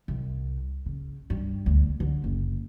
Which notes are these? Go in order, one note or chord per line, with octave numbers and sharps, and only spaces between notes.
C2
C#3
G2
D2
D3
F#1